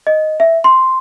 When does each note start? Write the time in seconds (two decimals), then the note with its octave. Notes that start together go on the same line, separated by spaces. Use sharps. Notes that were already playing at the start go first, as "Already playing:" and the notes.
0.07 D#5
0.40 E5
0.64 C6